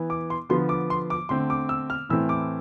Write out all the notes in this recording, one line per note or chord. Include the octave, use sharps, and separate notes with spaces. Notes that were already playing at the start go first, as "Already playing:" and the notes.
Already playing: E3 B3
D6
C6
D3 F3 B3 C6
D6
C6
D6
D3 A3 C4 C6
D6
E6
F6
A2 E3 A3 C4 E6
D6